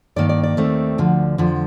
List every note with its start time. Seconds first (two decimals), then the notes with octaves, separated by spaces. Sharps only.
0.16 G2 D#3 A#3 D5
0.29 D5
0.43 D5
0.57 D#2 D#3 A3 C4
0.98 D2 D3 F3
1.38 F2 D3 F3